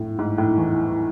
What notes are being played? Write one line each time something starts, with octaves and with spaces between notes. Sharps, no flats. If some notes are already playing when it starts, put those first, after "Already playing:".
Already playing: A2
G#2
A2
E2